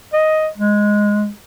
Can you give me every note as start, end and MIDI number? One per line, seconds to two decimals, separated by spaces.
0.14 0.48 75
0.58 1.29 56